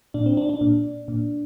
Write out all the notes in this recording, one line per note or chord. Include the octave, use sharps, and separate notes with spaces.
A#2 D4
C4
D4
D4
A#2
A#2